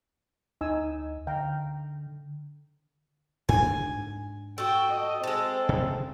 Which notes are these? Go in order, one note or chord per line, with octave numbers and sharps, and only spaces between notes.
D2 D#4 G#5 E6
D3 F5 G5 A#5
G#2 D4 G#5
F#4 A4 G5
D#5
G#3 C4 A4
C3